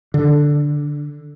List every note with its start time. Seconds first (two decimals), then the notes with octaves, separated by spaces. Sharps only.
0.14 D3